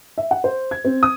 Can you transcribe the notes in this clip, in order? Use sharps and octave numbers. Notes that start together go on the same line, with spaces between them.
E5
F#5
C5
G#6
C4
D#6